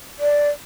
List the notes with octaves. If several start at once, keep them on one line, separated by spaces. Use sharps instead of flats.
D5